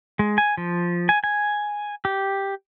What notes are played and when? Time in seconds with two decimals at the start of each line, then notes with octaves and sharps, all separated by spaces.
0.19 G#3
0.38 G#5
0.57 F3
1.09 G#5
1.24 G#5
2.05 G4